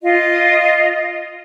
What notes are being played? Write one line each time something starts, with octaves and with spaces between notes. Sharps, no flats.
F4 D#5